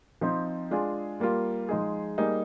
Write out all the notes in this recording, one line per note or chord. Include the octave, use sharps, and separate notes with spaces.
F3 C4 D#4
G#3 D4 F4 G#4
G3 A#3 F4
F3 G#3 D#4 G#4
G3 A#3 D#4 G#4